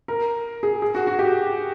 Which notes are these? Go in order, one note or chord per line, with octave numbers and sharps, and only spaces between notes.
A#4
G#4
G#4
F#4
F#4
G4